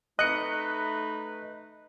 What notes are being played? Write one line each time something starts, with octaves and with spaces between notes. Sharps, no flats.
A3 D#4 B4 D#5 F#6 C#7